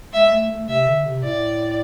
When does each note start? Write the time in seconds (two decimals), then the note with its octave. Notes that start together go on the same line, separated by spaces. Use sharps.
0.13 G#3 E5
0.32 A3
0.50 A3
0.68 C3 E5
0.87 D3
1.05 C3
1.23 A2 D5